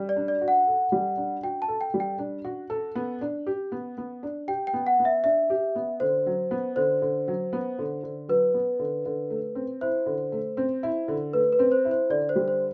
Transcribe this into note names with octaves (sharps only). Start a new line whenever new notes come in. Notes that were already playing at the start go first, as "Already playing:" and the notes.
Already playing: G3
D5
D4
D5
F#4
F#5
A4
G3
D4
F#4 G5
A5
A4
G5
G3
G5
D4
F#4
A4
B3
D4
G4
B3
B3
D4
G4 G5
G5
B3
F#5
B3
E5
D4 E5
G4
B3
D3 C5
F#3
B3
D3 C5
D3
F#3
B3
D3
D3
F#3 B4
B3
D3
D3
A3
C4
E4 C5
D3
A3
C4
E4
D3
A3 B4
B4
C4
C5
E4
C5
D3 D5
C5
G3
C5